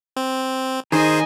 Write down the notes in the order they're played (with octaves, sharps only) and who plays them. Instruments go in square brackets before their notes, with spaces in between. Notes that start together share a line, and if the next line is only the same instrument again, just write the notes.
[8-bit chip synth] C4
[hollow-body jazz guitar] D#3 [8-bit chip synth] G#4 C5 [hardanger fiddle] D#5 G#5